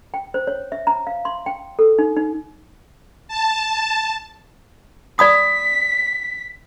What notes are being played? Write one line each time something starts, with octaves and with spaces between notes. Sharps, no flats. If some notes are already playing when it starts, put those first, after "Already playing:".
G5
C5
C#5
E5
A#5
F5
C6
G5
A4
D#4
D#4
A5
D5 B5 D#6 B6